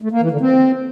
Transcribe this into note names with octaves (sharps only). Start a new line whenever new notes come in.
A3
A#3
E3
D3
C4